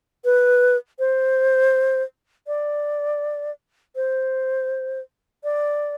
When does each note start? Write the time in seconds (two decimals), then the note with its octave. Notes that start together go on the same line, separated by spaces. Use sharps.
0.25 B4
0.99 C5
2.47 D5
3.96 C5
5.44 D5